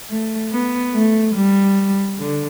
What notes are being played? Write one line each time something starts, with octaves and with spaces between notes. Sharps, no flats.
A3
B3
A3
G3
D3